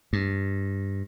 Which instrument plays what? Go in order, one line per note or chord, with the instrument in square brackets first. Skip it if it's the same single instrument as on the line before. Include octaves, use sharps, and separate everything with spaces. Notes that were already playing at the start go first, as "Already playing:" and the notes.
[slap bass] G2